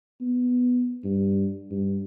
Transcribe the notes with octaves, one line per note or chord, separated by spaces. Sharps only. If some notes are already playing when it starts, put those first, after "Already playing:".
B3
G2
G2